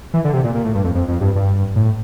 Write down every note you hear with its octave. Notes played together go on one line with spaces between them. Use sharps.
E3
D3
C3
A#2
A#2
A2
G2
F2
F2
F2
G2
G2
A2